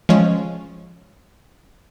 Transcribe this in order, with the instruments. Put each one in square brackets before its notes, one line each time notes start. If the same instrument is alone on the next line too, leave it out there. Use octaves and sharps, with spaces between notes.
[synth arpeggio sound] F3 G#3 C#4